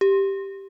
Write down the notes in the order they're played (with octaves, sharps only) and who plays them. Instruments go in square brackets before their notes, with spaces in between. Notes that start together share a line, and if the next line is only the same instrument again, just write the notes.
[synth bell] G4